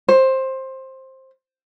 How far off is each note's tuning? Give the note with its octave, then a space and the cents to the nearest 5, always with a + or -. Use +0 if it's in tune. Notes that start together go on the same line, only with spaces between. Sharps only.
C5 +15